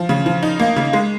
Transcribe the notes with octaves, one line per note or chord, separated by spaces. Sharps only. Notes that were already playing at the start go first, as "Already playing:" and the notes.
Already playing: F3
C#3
F3
D#4
A#3
C#3
G#3